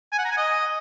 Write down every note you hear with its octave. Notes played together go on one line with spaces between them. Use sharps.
G#5
F#5
A#5
G#5
D#5